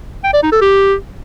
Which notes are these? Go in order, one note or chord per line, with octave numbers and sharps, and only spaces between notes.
G5
D5
D#4
A4
G4